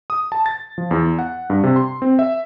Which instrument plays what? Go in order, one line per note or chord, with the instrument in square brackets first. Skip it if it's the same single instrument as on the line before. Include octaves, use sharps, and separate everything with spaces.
[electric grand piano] D#6
A5
A6
F3
E2
F#5
G2
C3
C6
C4
E5